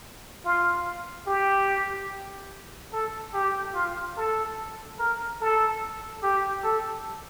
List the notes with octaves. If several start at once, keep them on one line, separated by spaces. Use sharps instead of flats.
F4
G4
A4
G4
F4
A4
A#4
A4
G4
A4